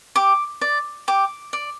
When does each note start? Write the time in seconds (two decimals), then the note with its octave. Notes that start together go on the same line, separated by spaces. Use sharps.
0.16 G4 D6
0.61 D5
1.08 G4 D6
1.53 D5